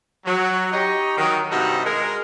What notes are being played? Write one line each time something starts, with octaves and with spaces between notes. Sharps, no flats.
F#3
D#4 G4 C#5 D#5
D#3 F#3
G2 C3 D#4 F#4 A4 F#5
G#3 A#4